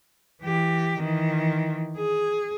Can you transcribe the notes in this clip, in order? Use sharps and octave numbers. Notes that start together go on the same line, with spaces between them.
E3 G4
D#3 E3
G#4